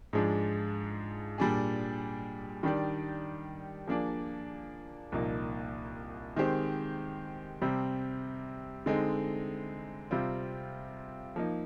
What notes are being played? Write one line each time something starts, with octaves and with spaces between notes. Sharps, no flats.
G#2 F3 G#3 D4
A#2 G3 D4 G#4
D#3 G3 D4 G4 D5
F3 A#3 D4 G#4 D5
C2 A#2 F3 A#3 D#4
D#3 G#3 C4 G4 C5
C3 G3 C4
D3 G#3 C4 D#4
C3 G3 C4 F4
F3 A#3 D#4